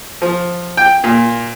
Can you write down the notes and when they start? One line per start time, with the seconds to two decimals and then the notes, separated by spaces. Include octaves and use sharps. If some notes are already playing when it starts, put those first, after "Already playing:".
0.22 F3
0.77 G5
1.04 A#2